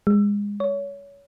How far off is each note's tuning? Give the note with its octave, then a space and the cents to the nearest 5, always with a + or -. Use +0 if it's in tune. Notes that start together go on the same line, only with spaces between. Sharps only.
G#3 -25
C#5 +25